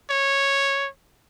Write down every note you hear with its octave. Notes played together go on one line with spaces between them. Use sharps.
C#5